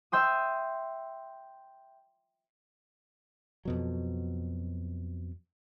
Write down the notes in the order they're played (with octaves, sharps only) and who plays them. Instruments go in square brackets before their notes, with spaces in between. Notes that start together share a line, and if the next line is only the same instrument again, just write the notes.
[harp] E5 G5 C6 D#6
[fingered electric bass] F2 B2 F#3